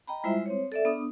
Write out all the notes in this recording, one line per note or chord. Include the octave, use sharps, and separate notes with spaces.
D#5 G5 A#5 B5
G3 G#3 E4 F4 C5 E5
C4 C5 C#5
A4 D5 E5
B3 D4 D#6